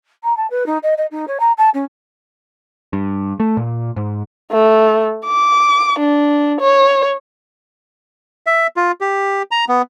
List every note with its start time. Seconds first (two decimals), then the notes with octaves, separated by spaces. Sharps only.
0.23 A#5
0.36 A5
0.50 B4
0.66 D#4
0.83 D#5
0.97 D#5
1.11 D#4
1.27 C#5
1.39 A#5
1.57 A5
1.74 C#4
2.93 G2
3.40 A3
3.57 A#2
3.96 G#2
4.51 A3
5.26 D6
5.99 D4
6.61 C#5
8.47 E5
8.77 F4
9.01 G4
9.51 A#5
9.69 B3